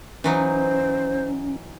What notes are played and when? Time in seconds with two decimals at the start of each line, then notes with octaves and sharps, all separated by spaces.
0.24 E3 F#3 C#4 D#4 C5